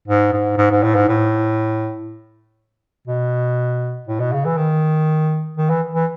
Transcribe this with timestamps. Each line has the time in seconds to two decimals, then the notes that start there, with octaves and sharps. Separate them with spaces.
0.08 G#2
0.33 G#2
0.58 G#2
0.70 G#2
0.83 A2
0.95 G#2
1.08 A2
3.07 B2
4.07 A2
4.20 B2
4.33 C#3
4.45 E3
4.57 D#3
5.57 D#3
5.70 E3
5.95 E3